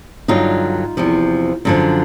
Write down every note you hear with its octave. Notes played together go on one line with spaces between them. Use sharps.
G2 D3 F#3 D#4 F4
E2 C3 F3
F#2 D3 F3